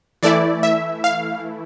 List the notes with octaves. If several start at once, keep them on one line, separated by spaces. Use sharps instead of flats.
E3 A3 E4 D5
E5
F5